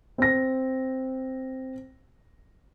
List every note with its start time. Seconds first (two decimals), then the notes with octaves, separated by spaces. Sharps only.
0.18 C4 A#6